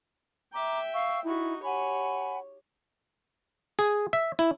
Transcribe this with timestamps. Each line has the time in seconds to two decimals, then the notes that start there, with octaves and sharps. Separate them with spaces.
0.53 E5 G5 A#5 D6
0.93 F5 C#6 E6
1.24 D#4 E4 F#4
1.63 G4 C#5 F#5 G#5 B5
3.79 G#4
4.13 E5
4.39 E4